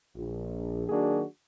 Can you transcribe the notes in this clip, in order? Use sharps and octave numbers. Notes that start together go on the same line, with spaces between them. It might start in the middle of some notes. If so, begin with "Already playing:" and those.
A#1
D#3 F#3 A#3 D4 F#4 G#4